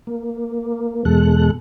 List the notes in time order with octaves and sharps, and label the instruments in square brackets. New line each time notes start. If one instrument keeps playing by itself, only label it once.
[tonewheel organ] A#3
E2 B2 G#3 A4 F#6